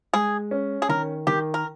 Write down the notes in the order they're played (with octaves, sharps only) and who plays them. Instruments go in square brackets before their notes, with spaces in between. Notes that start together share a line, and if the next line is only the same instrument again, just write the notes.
[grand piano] G#3 [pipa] G#4
[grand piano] C#4
[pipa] G#4
[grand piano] D#3 [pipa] A#4
[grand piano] D#3 [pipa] G4
[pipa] A#4